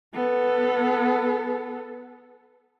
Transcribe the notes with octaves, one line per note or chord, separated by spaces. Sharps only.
B3 A4